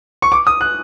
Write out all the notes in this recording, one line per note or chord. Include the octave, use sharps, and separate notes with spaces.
C#6
D6
D#6
F#6